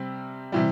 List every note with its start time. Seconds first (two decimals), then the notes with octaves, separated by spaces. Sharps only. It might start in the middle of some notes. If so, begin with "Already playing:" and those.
Already playing: C3 G3 C4
0.52 C3 E3 G3